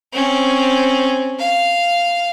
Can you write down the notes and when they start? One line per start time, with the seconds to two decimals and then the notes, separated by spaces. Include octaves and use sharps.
0.13 C4 C#4
1.39 F5